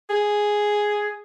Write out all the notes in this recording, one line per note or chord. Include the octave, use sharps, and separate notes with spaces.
G#4